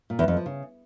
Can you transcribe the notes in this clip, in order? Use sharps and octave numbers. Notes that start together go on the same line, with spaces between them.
A#2
E2
F2
F3
C#3